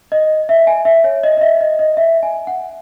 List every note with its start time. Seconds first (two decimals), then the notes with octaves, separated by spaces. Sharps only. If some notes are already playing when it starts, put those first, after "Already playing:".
0.12 D#5
0.49 E5
0.67 G#5
0.85 E5
1.04 C#5
1.24 D#5
1.37 D#5
1.41 E5
1.61 D#5
1.79 D#5
1.97 E5
2.23 G#5
2.47 F#5